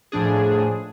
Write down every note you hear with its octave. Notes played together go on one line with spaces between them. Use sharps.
A2 F3 D4 G#4